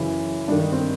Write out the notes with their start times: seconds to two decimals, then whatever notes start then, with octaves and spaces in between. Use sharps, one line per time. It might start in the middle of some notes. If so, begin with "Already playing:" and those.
Already playing: F#2 C#3 E3 C#4
0.48 G2 D#3 D4
0.60 D#4
0.72 C4